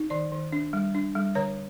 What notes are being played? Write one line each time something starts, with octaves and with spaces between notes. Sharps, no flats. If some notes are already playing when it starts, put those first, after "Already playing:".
Already playing: D#4
D#3 D5
D#3
D4
G3
D4
G3
D3 C#5